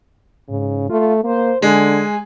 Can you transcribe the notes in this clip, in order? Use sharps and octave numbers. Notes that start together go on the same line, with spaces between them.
G#2 C#3
A3 F4
A#3 C5
D3 G#3 G#5